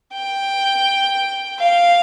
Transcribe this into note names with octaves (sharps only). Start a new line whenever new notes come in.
G5
F5